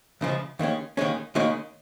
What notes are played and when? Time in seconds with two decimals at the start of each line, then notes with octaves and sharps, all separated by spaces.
0.21 C#2 C#3 F3 G#3
0.59 D#2 D#3 G#3 C#4
0.97 D#2 D#3 G#3 C#4
1.35 D#2 D#3 G#3 C#4